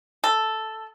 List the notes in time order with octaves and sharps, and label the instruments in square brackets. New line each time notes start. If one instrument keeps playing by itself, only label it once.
[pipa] A4